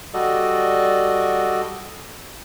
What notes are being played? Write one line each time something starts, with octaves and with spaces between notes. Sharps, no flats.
G3 F#4 A4 D5 D#5